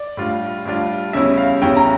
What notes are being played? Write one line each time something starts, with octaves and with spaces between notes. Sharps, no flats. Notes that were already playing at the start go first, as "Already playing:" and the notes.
Already playing: D5
A2 G3 D4 F4
A2 G3 D4 F4
E2 C#3 G3 C#4 E4 E5
F5
E2 C#3 G3 C#4 E4 G5
A#5